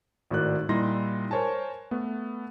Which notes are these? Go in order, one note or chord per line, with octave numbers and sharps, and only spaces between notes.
G#1 A2 D#3 F#4 D5 F#6
A#2 G3 D#4 E4 C6 A#6
A#4 C5 C#5 G#5 A5
A3 B3